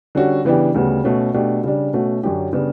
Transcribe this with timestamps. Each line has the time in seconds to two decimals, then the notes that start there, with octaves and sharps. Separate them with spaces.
0.15 D3 G3 C#4 F#4
0.45 C#3 E3 B3 D4 G4
0.74 D2 C#3 G3 B3
1.04 B2 A3 C#4
1.34 B2 A3 D4 G4
1.64 C#3 G3 D4
1.93 B2 A3 C#4 F#4
2.23 F#2 D3 F#3 C#4 G4
2.53 C#3 G3 B3 D4